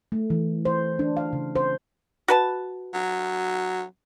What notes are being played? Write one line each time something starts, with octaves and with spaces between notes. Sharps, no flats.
A3
E3
C5
D4
F5
C#3
C5
F#4 B4 A5
F#3